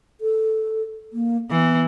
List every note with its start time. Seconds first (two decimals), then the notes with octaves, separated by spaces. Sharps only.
0.21 A4
1.13 A#3
1.50 E3 B3